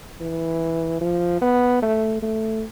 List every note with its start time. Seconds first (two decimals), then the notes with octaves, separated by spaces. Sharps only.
0.21 E3
1.01 F3
1.42 B3
1.82 A3
2.22 A3